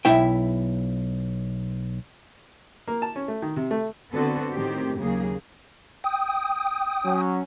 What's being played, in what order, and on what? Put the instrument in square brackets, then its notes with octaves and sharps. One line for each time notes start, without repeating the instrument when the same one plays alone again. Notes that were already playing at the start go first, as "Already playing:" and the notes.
[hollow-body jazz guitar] B1 E4 E5 G5
[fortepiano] A#3
A5
C#4
A3
D#3
C3
A3
[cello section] D3 B3 C4 F#4 A4
A2 D#3 C4 G4
D#2 C#3 F#3 A#3 G#4
[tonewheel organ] G5 D#6
[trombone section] F#3 C#4